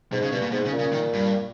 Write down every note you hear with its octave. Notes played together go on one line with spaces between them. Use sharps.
G#2 B2
C#3
G2 B2
A#2
G#2 B2
C#3
A#2
C#3
D#3
G2